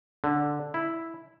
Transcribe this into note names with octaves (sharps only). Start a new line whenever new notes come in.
D3
E4